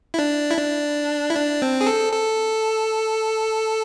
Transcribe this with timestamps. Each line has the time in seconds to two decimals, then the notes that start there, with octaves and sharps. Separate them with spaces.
0.14 E4
0.19 D4
0.51 E4
0.57 D4
1.30 E4
1.35 D4
1.62 C4
1.81 G#4
1.87 A4
2.13 A4